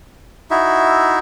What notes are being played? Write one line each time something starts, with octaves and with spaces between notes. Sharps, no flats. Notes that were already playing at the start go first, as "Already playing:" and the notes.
D#4 E4 F#4 E5